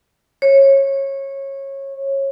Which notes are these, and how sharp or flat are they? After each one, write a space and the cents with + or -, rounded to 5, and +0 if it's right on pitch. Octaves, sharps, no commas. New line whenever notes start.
C#5 -20